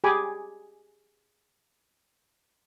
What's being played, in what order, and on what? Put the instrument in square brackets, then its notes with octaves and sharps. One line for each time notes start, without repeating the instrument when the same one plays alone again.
[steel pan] G4 G#4 G#5 B5 D6